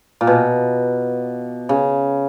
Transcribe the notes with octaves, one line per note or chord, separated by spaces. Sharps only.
A#2
B2
C#3